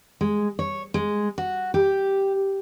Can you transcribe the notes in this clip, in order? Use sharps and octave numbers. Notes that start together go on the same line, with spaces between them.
G#3
C#5
G#3
F#4
G4